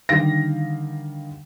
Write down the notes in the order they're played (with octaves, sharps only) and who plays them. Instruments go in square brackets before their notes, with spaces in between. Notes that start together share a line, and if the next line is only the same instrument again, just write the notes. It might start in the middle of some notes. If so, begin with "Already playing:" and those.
[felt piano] D3 D#3 G3 F5 A#6